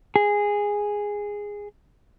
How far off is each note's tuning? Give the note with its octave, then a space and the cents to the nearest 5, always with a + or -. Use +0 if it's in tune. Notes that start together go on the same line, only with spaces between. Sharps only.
G#4 -10